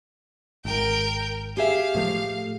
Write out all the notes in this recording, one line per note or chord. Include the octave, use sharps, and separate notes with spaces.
G#1 A#4 G5
G4 G#4 E5 F5
A2 F3 A3